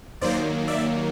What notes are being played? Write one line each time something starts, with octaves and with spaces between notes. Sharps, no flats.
D#2 D#3 F#3 A#3 C5 D5
D5 E5